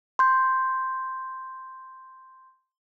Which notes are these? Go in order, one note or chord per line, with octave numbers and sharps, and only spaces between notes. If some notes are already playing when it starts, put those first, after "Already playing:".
C6 G6